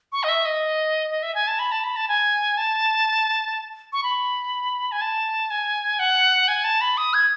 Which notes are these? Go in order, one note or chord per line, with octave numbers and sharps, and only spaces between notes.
C#6
D#5
E5
D#5
D#5
E5
G#5
A5
B5
A5
B5
A5
G#5
A5
C#6
B5
G#5
A5
G#5
F#5
G#5
A5
B5
D#6
G#6